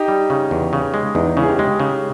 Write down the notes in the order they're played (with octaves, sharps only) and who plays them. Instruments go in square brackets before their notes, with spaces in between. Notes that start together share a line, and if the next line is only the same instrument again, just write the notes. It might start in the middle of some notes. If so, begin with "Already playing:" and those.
Already playing: [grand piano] D#4 G4
[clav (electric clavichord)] G3
C#3
E2
C#3
G#3
[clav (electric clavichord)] E2 [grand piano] D#4
[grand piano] D#4
[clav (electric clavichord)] C#3 [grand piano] C#4 E4
[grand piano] G#4
D#4 G4
[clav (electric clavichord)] G#3 [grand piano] D#4 G4
[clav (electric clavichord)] C#3